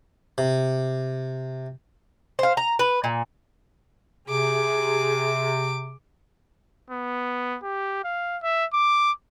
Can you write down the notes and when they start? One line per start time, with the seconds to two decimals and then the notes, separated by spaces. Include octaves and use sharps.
0.38 C3
2.39 C5 F5
2.57 A#5
2.79 B4
3.04 A#2
4.29 C3 G#4 D6
6.90 B3
7.63 G4
8.04 F5
8.43 E5
8.73 D6